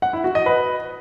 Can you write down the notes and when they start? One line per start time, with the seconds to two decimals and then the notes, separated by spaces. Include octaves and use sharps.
0.02 F#5
0.13 E4
0.24 F#4
0.35 D#5
0.46 B4